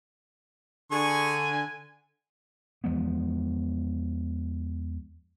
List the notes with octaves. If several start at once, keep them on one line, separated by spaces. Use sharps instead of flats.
D3 G#4 G#5 C#6
E2 F3 G#3 B3